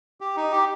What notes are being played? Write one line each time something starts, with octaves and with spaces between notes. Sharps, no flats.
G4
D#4
G4